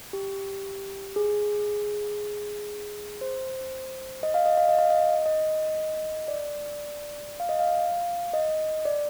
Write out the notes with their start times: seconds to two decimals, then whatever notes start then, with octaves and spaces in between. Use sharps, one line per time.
0.13 G4
1.16 G#4
3.21 C5
4.23 D#5
4.34 F5
4.46 D#5
4.57 F5
4.69 D#5
4.79 F5
4.90 D#5
5.26 D#5
6.28 D5
7.40 F5
7.49 D#5
7.59 F5
8.34 D#5
8.85 D5